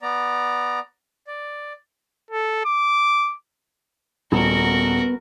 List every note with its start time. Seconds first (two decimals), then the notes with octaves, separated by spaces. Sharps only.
0.02 B3 D5 A#5
1.27 D5
2.31 A4
2.65 D6
4.32 D#1 B3 F#4 A#4